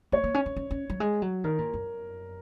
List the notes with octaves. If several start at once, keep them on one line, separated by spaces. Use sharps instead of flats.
A#3 C#5
A#3
C#4
C#4
C#4
C#4
F#3
G#3
F#3
D#3 A#4
A#2
F#2